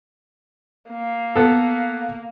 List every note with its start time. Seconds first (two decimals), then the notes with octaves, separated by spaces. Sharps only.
0.90 A#3
1.36 B3 A4